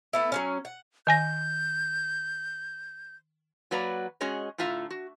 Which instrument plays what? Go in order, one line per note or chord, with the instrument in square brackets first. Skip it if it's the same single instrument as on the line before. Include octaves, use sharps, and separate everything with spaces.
[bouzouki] A3 B3 E4
F#3 B3 C#4
F#5
[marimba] D#3 G#5 A#6 [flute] G6
[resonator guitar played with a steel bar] F#3 A#3 F#4 B4 D5 A#5
G#3 C#4 F#4 G#4 C#5 D#5
A2 D3 F4 E5 A#5
F#4